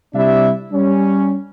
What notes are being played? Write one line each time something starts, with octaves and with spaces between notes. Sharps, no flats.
C3 G3 D4 E4 E5
G3 C#4